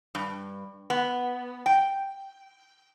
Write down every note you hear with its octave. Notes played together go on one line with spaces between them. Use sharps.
G2
B3
G5